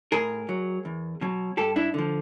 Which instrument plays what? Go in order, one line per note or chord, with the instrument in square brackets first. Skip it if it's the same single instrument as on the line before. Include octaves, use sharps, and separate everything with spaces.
[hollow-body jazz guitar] A2 G#4 A#4
F#3
E2
B2 F#3
G2 G4 A4
D4 E4
D3 F3